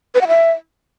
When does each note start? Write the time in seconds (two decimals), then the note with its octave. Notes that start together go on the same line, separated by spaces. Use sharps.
0.15 B4
0.21 F#5
0.28 E5